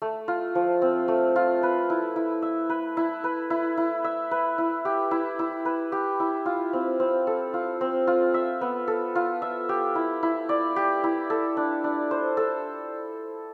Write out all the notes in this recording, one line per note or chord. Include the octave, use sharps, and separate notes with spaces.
A3
F4
F3
C4
A3
F4
B4
E4
E4
E5
B4
E4
B4
E4
E4
E5
B4
E4
G4
E4
E4
B4
G4
E4
F4
C4
C4
A4
F4
C4
F4
E5
B3
A4
F4
E5
G4
E4
E4
D5
G4
E4
A4
D4
D4
C5
A4